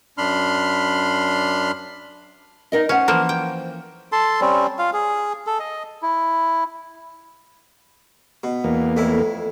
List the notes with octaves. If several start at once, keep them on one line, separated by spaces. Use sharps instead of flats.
F#2 D4 B5 C6 F6
D#4 A#4 D#5
C#4 C5 F#5
E3 F3 A#3
G5
A4 A5 C6
G3 C4 C#4
F4 F5
G#4
A4
D#5
E4
B2
E2 A#3
F2 A2 E4